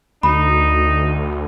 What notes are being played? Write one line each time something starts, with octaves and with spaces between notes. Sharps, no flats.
D2 D#4 B5